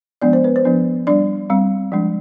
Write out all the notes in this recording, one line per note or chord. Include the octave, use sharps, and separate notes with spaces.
F3 G#3 B3 D4 D5
C5
B4
C5
F3 B3 D4
G3 D4 D5
G3 C4
F3 G#3 D4